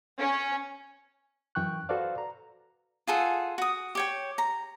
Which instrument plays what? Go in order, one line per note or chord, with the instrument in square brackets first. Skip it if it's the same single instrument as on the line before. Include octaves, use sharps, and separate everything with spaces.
[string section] C#4
[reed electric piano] F#2 E3 G5 C#6 F#6
F#4 A4 B4 C5 D5 F5
A#5
[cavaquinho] F4 G#4 A4 F#5
F#4 D#6
G4 C#5 G5
A#5